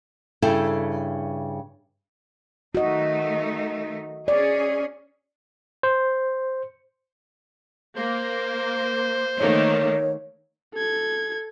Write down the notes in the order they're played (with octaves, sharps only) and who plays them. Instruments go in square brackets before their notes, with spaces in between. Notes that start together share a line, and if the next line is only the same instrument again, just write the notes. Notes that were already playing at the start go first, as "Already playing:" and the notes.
[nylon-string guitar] G2 C#3 E4 A4 G5
[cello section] D#3 A3 D#4 [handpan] F#4 D#5
[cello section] C#4 G#4 [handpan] D5
[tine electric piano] C5
[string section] A#3 [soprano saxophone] C5
[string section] D#3 A3 A#3 [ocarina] C#5
[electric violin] A4 G#6